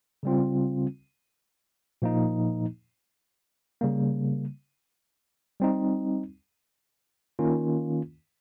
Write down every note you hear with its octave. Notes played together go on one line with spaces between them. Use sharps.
C#3 G3 C4 F4
A#2 F3 A#3 D#4
C#3 G3 A#3
G3 C4 D#4
D#3 A#3 C#4 F4